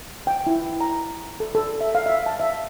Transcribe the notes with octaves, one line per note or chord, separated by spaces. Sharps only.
G5
E4
A#5
A4
A4
E5
F5
E5
A5
E5